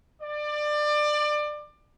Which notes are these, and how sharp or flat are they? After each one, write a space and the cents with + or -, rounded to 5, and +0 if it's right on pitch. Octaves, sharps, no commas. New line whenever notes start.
D5 +25